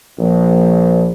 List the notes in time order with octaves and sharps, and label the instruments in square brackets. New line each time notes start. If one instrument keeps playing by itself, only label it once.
[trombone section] A#1